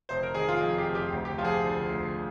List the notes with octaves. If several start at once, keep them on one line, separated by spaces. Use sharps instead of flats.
F1 C5
A#4
D#3 G#4
F4
F2 G#4
G4
F1
G4
D2
G4
F3 F4
G#4
G4
D3
D2